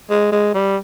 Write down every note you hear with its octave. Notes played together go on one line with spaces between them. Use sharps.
G#3
G#3
G3